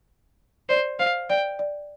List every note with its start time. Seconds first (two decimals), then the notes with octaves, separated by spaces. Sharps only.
0.69 C5 D5
0.99 C5 F5
1.30 D5 G5
1.59 D5